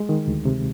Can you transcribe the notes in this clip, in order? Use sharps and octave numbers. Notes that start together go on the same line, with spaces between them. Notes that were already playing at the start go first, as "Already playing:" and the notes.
Already playing: G#3
D#3
D2
C3